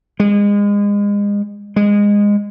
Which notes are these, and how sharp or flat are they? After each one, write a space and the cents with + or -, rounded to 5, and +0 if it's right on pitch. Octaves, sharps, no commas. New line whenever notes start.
G#3 -30
G#3 -20